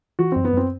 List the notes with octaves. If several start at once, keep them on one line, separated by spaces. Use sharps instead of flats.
E3 F#4
F#2 C4
B3
F#2 C4